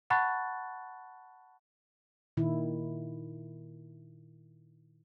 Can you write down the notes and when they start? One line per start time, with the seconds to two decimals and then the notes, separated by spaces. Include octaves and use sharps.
0.10 F#5 A5 B5 C#6 F#6 A6
2.37 A#2 D#3 E4